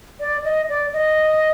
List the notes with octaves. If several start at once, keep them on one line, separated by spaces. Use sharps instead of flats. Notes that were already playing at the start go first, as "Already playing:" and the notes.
D5
D#5
D5
D#5